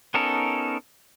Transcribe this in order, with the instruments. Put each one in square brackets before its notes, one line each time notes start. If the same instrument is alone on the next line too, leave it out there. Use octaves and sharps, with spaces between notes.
[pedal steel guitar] B3 C#4 D#4 A4 A#4